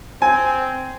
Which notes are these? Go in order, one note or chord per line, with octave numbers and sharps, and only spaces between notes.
C4 G#5